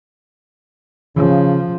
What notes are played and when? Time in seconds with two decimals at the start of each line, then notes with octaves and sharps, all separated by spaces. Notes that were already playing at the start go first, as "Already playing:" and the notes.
1.16 C#3 F3